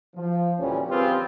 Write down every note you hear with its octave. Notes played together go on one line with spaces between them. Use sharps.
F3
D2 A#2 E3 G3 C#4
C4 F4 G4 G#4 B4